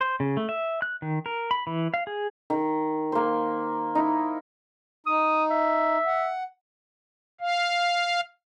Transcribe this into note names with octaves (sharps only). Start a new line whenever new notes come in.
C5
C#3
A3
E5
F#6
D#3
A#4
B5
E3
F5
G#4
D#3
A#3 C5
D#4 E4
D#4 D#6
E5
F#5
F5